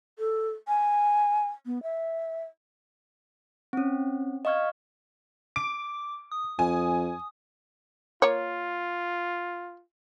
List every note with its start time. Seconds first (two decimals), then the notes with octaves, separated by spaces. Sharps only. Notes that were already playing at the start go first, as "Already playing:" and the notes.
0.19 A4
0.68 G#5
1.66 B3
1.83 E5
3.73 C4 C#4
4.45 D#5 F5 C#6 F6 G#6
5.56 D6 D7
6.32 D#6
6.59 F2 G#5
8.22 A#3 F4 C#5